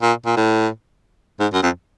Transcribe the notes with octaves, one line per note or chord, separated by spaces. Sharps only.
A#2
A#2
A2
G#2
F#2
F2